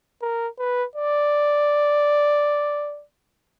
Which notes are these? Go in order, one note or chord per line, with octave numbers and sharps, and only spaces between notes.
A#4
B4
D5